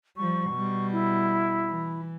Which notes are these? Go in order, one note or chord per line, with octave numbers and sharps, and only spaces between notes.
F3 G3 C#6
B2 G3
E4
E3